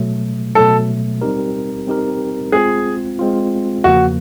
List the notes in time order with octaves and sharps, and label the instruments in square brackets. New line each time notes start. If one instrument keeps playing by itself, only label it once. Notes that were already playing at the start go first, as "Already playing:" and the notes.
Already playing: [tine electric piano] B2 F#3 A3
[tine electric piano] B2 F#3 A3 [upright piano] A4
[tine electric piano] G3 C4 D#4 G4 A#4
G3 C4 D#4 G4 A#4
[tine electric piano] G#3 C4 F4 [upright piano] G#4
[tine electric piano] G#3 C4 F4
[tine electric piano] E2 C#3 F3 A#3 [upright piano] F#4